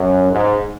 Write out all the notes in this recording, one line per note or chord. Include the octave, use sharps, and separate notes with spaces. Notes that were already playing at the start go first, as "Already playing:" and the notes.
Already playing: F#2
G#2